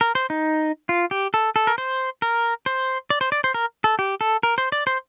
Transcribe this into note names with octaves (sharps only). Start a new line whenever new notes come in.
A#4
C5
D#4
F4
G4
A4
A4
A#4
C5
A#4
C5
D5
C5
D5
C5
A#4
A4
G4
A4
A#4
C5
D5
C5